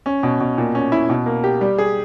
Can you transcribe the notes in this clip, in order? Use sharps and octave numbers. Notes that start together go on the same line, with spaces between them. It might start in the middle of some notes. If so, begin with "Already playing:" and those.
C#4
B2
B2
A#2
C#4
E4
B2
A#3
G4
G3
G#4